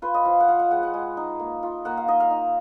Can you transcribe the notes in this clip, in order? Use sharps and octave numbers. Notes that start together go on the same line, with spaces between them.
F4 B4
D#5
F3 F5
F#5
F4 F5
F#5
G#3 F#5
F#5
G#3
D#4
A#3
F4
A#3 F#5
F5
D#4 D#5
F5
D#4